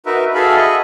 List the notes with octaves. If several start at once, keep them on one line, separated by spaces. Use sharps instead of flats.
D#4 F#4 A#4 B4 E5
F#4 G#4 A4 E5 F5 B5
D#5 B5 C#6